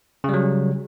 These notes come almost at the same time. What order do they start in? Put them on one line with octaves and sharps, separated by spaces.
C#3 G3 F#3